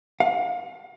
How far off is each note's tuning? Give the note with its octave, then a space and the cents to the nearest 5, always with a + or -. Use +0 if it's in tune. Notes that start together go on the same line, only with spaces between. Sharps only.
F5 +35